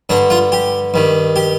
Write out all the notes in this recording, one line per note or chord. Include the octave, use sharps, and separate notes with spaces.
G2 D3 D4
F4
G4
G2 D#3
G4